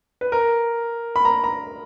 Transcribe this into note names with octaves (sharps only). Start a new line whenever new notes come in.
B4
A#4
B5
A#5
A#5